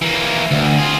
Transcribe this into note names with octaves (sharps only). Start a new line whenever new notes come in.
E3 A#3
D2
F4 G#4